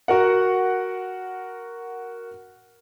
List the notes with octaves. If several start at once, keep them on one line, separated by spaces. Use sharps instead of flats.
F#4 A#4 F#5